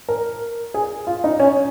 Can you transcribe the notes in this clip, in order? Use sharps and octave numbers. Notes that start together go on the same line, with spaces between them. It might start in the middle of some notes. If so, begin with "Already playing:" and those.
A#4
G#4
F4
D#4
C#4